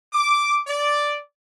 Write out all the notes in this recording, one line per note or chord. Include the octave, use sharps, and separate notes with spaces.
D6
D5